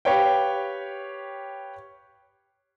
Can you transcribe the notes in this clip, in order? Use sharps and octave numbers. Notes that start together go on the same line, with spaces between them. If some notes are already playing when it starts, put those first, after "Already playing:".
G4 B4 C#5 F5 G5